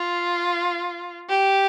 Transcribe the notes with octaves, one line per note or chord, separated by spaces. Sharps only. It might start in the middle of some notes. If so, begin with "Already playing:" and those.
Already playing: F4
G4